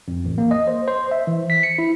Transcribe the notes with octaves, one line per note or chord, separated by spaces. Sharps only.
F2
A1
A#3
D#5
C5
C5
E5
E3
B6
C#7
E4